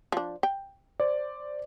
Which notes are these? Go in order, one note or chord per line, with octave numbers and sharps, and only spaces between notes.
F3 D4
G5
C5 D5